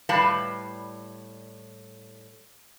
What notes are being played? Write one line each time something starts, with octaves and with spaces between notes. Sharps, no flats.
A2 G3 B4 F5 A5